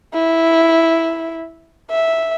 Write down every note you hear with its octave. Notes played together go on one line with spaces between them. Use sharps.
E4
E5